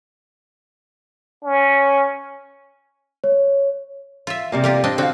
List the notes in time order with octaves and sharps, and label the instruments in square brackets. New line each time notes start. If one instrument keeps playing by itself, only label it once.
[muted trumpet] C#4
[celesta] C#5
[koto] F4 E5
[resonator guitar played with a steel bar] C3 G3 A#3
[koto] F4 G4 A#4
C4 D4 D#5
[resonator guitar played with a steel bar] D3 F5 [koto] C4 F#4